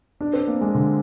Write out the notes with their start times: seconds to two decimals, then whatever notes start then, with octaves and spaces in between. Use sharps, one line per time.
0.21 D4
0.34 C4
0.47 A#3
0.61 G#3
0.75 D3